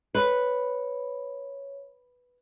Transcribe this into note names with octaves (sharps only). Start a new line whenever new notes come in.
B4 C#5